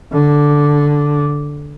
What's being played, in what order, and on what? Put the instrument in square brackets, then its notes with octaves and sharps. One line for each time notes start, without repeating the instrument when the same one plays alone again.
[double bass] D3